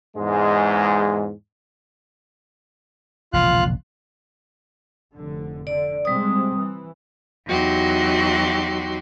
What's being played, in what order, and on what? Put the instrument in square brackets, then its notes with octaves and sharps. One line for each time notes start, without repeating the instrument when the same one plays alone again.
[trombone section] E2 G#2 G#3
[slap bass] E1 A#1 C#3 [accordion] F4 F5 F#6
[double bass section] F1 D3
[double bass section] D3 [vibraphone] D5
[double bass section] C3 G#3 C4 [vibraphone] G3 D#6
[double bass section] E3
[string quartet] E2 F#3 D#4 F#4 G4 C6